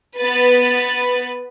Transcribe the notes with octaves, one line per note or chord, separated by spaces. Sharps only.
B3 B4 A6